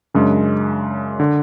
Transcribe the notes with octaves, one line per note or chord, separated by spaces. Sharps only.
F#2 C#3 G#3 D4
D3